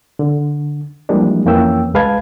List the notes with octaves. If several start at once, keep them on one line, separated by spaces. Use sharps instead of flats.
D3
E3 F3 G3 G#3 A#3 D4
F2 E3 A#3 C#4 G5 E6
C#2 G#3 B4 F5 A5 G#6